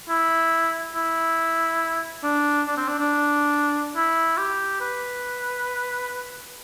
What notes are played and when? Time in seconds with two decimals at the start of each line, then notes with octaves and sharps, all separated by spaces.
0.09 E4
0.95 E4
2.23 D4
2.67 D4
2.77 C4
2.88 D4
2.99 D4
3.96 E4
4.38 G4
4.80 B4